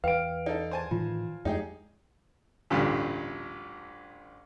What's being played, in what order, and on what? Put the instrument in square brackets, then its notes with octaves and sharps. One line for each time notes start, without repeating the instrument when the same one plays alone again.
[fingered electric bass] E2 [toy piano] B4 G5 [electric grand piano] F5 D7
[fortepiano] D#4 A4 [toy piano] D5
[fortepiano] C5 G#5 A5
[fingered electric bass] A2 D#3 E3 [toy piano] F4
[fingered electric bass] F2 G#3 A3 [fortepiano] D#4 G4 G#4
[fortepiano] A1 D2 G2 A#2